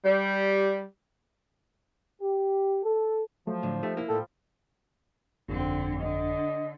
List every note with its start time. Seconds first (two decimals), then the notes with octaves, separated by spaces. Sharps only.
0.04 G3
2.22 G4
2.84 A4
3.47 F3 F#3 A3
3.63 A2 D3
3.83 A3 D#4 G4 E5
3.97 A#3 E4
4.09 A2 F3 G3 A4 G5
5.49 G1 F2 D3 C4
6.00 D3 D#5